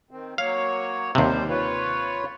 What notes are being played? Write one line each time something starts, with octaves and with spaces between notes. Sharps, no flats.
D#3 C4
F#3 A#3 C#5 F5
D#2 C3 F3 G3 C5
F4 B4 C#5